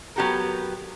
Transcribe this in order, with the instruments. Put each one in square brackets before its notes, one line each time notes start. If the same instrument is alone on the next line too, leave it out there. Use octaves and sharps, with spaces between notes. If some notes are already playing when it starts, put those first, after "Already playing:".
[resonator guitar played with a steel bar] F#3 B3 G4 A4 A#4